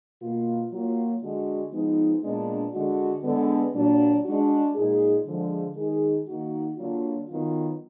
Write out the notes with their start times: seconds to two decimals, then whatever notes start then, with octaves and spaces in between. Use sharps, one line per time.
0.21 B2 A#3 F4
0.72 F#3 A#3 F4
1.22 D3 G#3 D4 F#4
1.73 F3 G#3 B3 D#4
2.23 A#2 G#3 B3 D4
2.74 D3 G#3 D4 F#4
3.24 D3 G#3 B3
3.74 A#2 F#3 D4
4.25 G#3 D4 F#4
4.75 A#2 G#3 D#4 G#4
5.26 D3 F3 G#3
5.76 D#3 G#3 D#4 G#4
6.27 D#3 A#3 D#4 F#4
6.77 D3 F#3 A#3 D4 F4
7.27 D#3 F#3 B3 F4